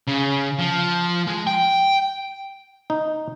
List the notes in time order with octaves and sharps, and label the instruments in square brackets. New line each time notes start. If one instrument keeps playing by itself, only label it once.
[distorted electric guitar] C#3
F3
G#3
G5
[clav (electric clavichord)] D#4